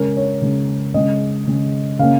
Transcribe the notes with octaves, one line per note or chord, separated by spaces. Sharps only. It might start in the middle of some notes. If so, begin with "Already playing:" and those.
Already playing: C#3 G#3 C#4 A#4
C#5
C#3 G#3 C#4
C#3 G#3 C#4 D#5
C#3 G#3 C#4
C#3 A#3 C#4 F5